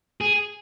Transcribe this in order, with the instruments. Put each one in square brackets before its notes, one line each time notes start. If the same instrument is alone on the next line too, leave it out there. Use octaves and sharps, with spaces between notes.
[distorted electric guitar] G#4